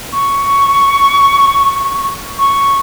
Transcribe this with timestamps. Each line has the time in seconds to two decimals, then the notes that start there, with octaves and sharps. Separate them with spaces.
0.12 C#6
2.38 C#6